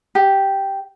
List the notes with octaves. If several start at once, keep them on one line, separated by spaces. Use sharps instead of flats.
G4